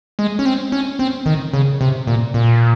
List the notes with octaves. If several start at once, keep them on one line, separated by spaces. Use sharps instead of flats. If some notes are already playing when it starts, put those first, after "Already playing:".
G#3
C#4
C4
C#4
C4
D#3
C#3
C3
A#2
A#2